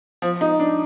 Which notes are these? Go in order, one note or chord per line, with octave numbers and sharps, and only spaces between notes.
F3
D#4
D4